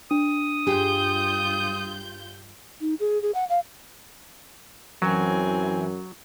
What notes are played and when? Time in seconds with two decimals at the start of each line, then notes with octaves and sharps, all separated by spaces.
0.11 D4 D#6
0.67 G2 F4 G4 G#4 G6
2.81 D#4
3.00 G#4
3.22 G#4
3.35 F#5
3.49 F5
5.02 F#2 E3 F#3 C4 G#5